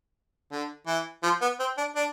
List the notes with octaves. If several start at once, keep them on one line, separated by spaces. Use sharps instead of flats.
D3
E3
F3
B3
C4
D4
D4